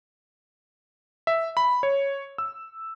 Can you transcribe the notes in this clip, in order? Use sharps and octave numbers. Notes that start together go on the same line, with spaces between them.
E5
B5
C#5
E6